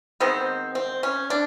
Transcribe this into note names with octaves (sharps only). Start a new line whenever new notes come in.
D#3 G#3 B3 C4
C4
C#4
D4